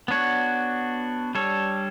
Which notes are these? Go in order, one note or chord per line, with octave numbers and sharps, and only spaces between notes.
B3 D4 F#4 C#5
G3 D4 A4 C#5